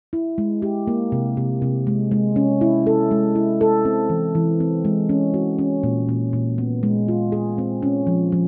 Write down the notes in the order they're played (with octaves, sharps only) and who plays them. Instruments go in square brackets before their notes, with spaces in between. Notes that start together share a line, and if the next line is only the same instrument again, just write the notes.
[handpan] E4
G#3
G4
A#3
C3
C3
C3
G#3
G#3
C#4
E4
A4
G#3
E4
A4
C4
E3
E3
C4
G#3
C#4
F#4
C#4
A#2
A#2
A#2
B3
G#3
F4
G#4
C4
C#4
F3
F3